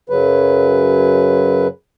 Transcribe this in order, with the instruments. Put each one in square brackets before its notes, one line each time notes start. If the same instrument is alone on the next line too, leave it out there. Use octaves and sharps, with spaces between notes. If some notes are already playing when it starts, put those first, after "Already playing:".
[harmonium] F#2 C#3 F#3 B4